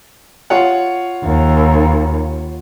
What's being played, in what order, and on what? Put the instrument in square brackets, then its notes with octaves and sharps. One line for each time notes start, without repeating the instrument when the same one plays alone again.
[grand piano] F4 C#5 F#5
[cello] D#2